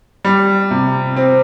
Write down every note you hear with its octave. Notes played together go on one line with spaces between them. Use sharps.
G3
C3
C4